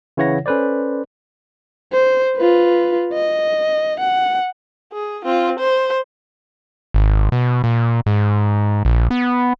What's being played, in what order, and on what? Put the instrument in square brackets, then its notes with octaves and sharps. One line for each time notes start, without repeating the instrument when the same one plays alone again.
[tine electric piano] C#3 E3 E4 C#5 F#5 A#6
C#4 A4 B4 C5 D5
[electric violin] C5
F4 B4
D#5
F#5
[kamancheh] G#4
C4 F4
C5
[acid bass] G#1
B2
A#2
G#2
A#1
B3